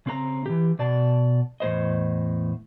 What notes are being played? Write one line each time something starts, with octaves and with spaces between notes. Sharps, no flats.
C#3 C4 B4 A#5
E3 G4
B2 D5 A5
E2 A2 C5 D#5